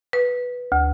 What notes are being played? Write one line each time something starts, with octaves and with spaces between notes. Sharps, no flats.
B4
D2